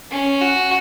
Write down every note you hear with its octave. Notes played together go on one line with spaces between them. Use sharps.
C#4
F#4